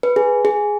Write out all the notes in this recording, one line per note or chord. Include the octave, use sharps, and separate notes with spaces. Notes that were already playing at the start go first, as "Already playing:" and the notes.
B4
G#4
G#4